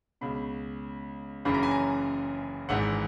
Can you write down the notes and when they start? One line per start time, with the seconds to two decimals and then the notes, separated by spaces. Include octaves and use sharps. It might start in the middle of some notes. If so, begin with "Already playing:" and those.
0.21 C#2 B2 B5
1.45 F#1 F#2 C#3 E3 B5
1.54 A#5
1.63 G#5
1.71 A#5
2.69 G#1 G#2 E3 F#5